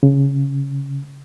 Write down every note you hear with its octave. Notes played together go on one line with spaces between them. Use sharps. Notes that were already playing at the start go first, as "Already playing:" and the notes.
C#3